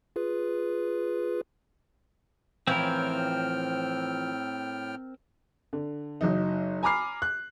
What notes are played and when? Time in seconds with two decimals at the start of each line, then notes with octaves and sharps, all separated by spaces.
0.16 F4 G#4 B4
2.67 A2 E3 F3 C4 C#4 A#4 G5 F6
5.73 D3
6.21 F#1 F#3 D#4
6.83 G#5 A#5 B5 D6 F6 C7
7.22 F#6